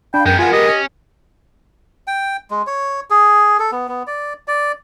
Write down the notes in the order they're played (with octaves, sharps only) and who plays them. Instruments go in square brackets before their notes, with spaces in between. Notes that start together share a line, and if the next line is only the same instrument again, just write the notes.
[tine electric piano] D4 [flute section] F5 B5 [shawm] G5
[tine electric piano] F#2 [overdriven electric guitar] G#3 B3 [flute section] A#4 [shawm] G5
[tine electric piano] F4 F#5 [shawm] G#5
[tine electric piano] G4 [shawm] D#5
[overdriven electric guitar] C#4
[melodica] G5
G#3
C#5
G#4
A4
B3
B3
D5
D5